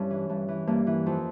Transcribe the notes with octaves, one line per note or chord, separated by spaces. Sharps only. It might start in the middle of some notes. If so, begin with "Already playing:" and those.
Already playing: G2 C#4 E4
E3
G2
E3
G2 A#3
E3
F2